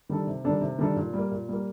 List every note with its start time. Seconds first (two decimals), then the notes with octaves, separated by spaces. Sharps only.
0.09 D#3 G3 D4 A4
0.27 C3
0.44 D#3 G3 D4 A4
0.61 C3
0.79 D#3 G3 D4 A4
0.96 A#2
1.13 G3
1.18 A#3
1.31 A#2
1.49 G3 A#3